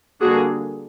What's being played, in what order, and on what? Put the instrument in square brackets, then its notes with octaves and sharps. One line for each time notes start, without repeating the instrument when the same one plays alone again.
[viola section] D3 G3 A#3 D4 F#4 G#4